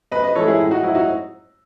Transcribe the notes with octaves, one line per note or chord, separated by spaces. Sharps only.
F#2 B4 D#5
B4 D#5
E3 G#3 A4 C#5
E4 G#4
A2
D#4 F#4
F#3 E4
D#4 F#4